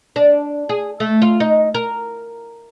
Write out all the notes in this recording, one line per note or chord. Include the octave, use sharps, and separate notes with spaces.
D4
G#4
A3
F4
D#4
A#4